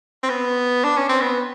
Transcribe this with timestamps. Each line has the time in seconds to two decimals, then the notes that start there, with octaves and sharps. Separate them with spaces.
0.23 C4
0.30 B3
0.84 D4
0.97 C#4
1.09 C4
1.21 B3